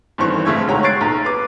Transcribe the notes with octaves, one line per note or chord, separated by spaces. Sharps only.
G1 G2 D#3 E3 C4 C#6
G1 C#3 A3 E5 C#6 G#6
B1 G#3 F#4 C#5 G5 A#5
C#6 F#6 G#6 A6 C7 D7
B1 A#5
B4 D6